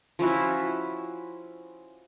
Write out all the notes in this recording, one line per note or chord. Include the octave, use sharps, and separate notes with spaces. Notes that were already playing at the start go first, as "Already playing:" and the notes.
F3 C#4 E4 F#4